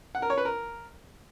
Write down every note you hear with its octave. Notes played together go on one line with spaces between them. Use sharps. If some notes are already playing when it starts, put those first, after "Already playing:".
F#5
A#4
C#5
B4
A#4